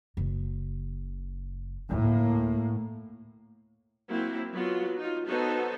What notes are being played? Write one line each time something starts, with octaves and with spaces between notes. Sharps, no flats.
F#1 C#3
D2 A2 A#3
F#3 A#3 C4 E4
F#3 B3 F4 F#4
D#4 F4
B3 D#4 F#4 A4 C5 C#5